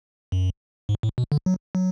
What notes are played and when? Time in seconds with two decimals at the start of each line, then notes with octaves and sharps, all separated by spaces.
0.32 F#2
0.89 G#2
1.03 A2
1.18 B2
1.32 D3
1.46 F#3
1.75 F#3